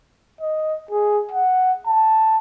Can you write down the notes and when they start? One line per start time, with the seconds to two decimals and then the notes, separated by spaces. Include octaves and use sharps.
0.41 D#5
0.91 G#4
1.31 F#5
1.87 A5